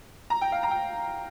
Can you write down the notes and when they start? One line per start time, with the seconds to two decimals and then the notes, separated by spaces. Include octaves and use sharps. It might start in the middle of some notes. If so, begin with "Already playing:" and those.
0.30 A#5
0.41 G5
0.52 F5
0.63 A#5
0.71 G5